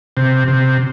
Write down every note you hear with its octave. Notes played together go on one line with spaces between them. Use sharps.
C3
C3